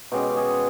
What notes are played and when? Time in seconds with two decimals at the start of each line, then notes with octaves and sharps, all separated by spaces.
0.12 B2 G#3 C#4 G4
0.37 G#4